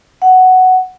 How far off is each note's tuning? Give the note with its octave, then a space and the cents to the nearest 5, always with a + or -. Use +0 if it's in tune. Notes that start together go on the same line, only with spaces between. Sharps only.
F#5 +5